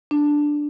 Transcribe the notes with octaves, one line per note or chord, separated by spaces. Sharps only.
D4